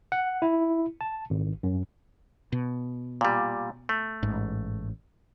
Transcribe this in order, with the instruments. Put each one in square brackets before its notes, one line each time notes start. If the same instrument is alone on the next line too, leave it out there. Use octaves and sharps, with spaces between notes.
[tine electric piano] F#5
E4
A5
G#1
F#2
[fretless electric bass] B2
[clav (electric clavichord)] A#2 G3
A3
[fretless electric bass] A1 G#2